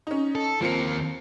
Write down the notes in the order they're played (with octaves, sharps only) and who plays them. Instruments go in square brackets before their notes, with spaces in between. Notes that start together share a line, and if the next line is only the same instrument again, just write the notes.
[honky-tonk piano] C#4 D#4
[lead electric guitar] A4
[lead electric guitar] D#2 A#3 [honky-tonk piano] F3 C4 C#7